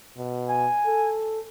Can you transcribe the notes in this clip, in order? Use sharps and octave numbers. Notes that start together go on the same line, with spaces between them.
B2
G#5
A4